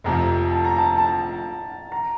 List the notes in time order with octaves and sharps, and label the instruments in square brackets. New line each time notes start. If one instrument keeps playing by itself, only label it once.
[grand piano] F1 F2 C3 F3 [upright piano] A#5
[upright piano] A5
A#5
A5
A5
A#5